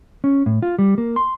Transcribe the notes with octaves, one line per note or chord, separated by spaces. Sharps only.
C#4
A2
F4
G3
A#3
C6